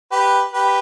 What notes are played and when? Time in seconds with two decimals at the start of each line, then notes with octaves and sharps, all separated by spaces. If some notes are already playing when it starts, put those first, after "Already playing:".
0.12 G4 B4
0.54 G4 B4